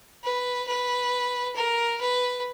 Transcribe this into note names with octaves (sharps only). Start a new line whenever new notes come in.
B4
B4
A#4
B4